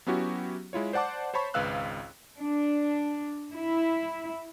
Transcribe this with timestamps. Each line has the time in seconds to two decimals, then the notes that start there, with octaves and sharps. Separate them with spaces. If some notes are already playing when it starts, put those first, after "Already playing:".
0.06 F#3 B3 C#4 E4 F#4 G4
0.73 G#3 E4 F4 C#5
0.93 C5 D5 F#5 A5 D6
1.34 C5 C#5 A5 B5 C#6
1.54 G#1 C#2 B4 F5 E6 F#6
2.40 D4
3.54 E4